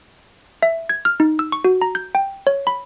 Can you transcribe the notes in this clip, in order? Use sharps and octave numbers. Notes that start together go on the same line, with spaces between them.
E5
G#6
F6
D#4
E6
C#6
F#4
A#5
G6
G5
C#5
B5